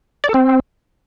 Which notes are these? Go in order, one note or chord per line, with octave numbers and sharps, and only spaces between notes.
D5
A4
C4